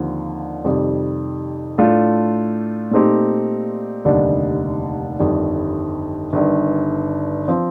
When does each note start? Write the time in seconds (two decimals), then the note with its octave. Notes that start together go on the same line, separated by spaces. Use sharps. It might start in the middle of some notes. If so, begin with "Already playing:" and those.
Already playing: D#2 D3 F3 C4
0.64 F2 C3 D#3 G3
1.78 A2 A3 D4 F4
2.91 A#2 A3 C4 D#4 G4
4.05 F1 D#2 D3 G3 D4
5.19 G1 F2 D#3 G3
6.33 G1 G2 D#3
7.48 F3 C4